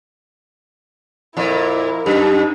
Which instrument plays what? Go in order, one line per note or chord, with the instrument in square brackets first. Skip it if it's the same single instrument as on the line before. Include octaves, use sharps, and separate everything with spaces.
[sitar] F2 A#2 [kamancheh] E4 A#4
[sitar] F#2 [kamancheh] D#4 [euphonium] G4